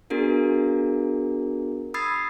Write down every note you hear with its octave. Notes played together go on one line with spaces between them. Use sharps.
B3 D4 F#4 G#4 A#4
B5 D#6 E6 G#6 A6 C7